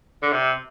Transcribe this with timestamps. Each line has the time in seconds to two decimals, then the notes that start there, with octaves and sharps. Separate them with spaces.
0.22 D3
0.32 C3